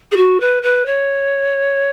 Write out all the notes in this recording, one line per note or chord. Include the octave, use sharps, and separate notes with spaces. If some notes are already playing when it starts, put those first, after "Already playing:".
G#4
F#4
B4
B4
C#5